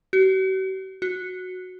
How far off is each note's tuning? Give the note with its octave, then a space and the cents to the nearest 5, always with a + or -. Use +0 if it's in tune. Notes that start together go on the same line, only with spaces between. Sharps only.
F#4 +45
F#4 -10